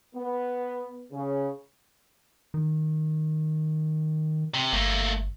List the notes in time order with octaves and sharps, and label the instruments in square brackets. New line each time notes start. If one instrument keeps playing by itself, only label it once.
[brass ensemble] B3
C#3
[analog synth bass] D#3
[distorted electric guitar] C3
[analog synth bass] G1 [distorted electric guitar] A3 A#3